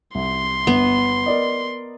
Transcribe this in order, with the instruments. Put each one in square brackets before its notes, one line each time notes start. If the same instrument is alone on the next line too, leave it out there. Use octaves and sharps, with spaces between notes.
[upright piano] C2 [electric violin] C6
[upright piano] G1 [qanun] B3
[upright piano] A#4 D5 D#5